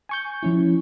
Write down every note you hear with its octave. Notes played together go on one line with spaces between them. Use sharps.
G#5 C#6 G6
F3 C#4 E4